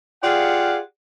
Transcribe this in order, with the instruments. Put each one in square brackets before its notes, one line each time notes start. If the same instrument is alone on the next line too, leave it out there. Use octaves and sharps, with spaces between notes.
[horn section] F4 G4 G#4 D5 F5 F#5